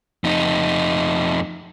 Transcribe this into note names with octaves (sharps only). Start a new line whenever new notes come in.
F2 D#4